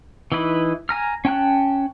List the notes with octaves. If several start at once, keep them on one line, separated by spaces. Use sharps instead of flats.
E3 D#4 E4 B4
G#5 A#5 F6
C#4 G5 A5 F#6